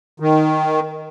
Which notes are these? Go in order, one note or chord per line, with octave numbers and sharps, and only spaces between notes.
D#3